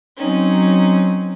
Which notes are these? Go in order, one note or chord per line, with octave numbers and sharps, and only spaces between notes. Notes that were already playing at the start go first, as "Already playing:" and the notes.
F#3 C4 C#4 D#4